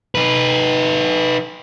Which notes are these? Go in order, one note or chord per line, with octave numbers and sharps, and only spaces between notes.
D#4 B4